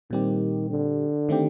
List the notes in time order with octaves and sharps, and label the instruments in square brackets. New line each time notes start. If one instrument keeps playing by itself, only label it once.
[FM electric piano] A#2 G3 C4 G4 [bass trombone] D#3
[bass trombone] D3
[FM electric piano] D#3 A3 C4 G4